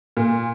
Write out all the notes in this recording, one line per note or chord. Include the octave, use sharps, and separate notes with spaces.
A#2